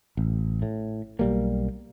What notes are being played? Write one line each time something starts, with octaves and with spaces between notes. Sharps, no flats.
A1
A2
B1 G3 A#3